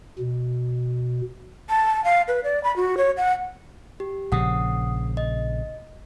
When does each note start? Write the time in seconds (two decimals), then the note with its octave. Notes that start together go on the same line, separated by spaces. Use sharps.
0.19 B2
1.70 A5
2.04 F5
2.28 B4
2.44 D5
2.64 B5
2.76 F#4
2.97 C#5
3.17 F#5
4.00 G4
4.32 A#1 C#3 F#5 D#6
5.17 D#5